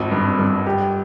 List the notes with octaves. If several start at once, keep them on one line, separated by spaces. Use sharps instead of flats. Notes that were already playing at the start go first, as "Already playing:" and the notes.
Already playing: G#1 F2
G2
G2
G4